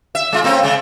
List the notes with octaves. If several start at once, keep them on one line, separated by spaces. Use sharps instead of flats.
E5
G#3 F4
A3 C4 C#4
C#3 G#3